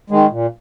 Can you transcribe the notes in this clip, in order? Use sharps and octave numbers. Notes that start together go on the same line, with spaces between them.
D#3 G#3
A#2